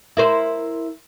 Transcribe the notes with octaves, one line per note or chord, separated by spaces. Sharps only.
E4 A#4 C5